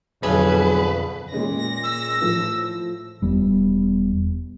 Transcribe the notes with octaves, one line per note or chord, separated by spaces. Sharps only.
B1 F2 B2 D3 G#4 B4
A#2 G#3 C#4 A#6
E6
A2 F3
E1 G3 B3